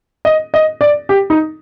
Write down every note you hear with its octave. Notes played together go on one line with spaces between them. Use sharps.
D#5
D#5
D5
G4
D#4